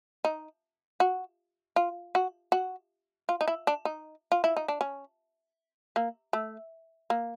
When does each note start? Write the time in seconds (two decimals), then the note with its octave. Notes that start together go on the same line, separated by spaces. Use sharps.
0.25 D#4
1.00 F#4
1.76 F4
2.15 F#4
2.52 F#4
3.29 F4
3.41 D#4
3.48 E4
3.67 D4
3.85 D#4
4.32 F4
4.44 E4
4.57 D#4
4.68 D4
4.81 C#4
5.96 A#3
6.33 A3
7.10 A#3